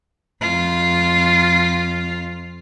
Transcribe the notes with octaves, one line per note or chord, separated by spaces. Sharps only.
F2 F4